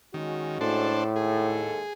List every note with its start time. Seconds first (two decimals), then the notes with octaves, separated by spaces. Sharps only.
0.14 D#3 G#3 C#4 F#4
0.61 A2 D4 A4 C5
1.16 D#2 G#2 G#4 A4